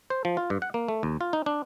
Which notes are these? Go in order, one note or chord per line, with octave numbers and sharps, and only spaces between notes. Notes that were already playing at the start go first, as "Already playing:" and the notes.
C5
F3
F4
G2
F#5
A#3
A3
D#2
F4
D#4
D4